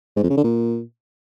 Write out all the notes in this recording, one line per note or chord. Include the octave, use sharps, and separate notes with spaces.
G#2
F2
C#3
D3
A#2